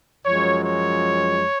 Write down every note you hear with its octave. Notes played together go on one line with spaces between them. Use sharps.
F#2 F3 G#3 C#5
C#5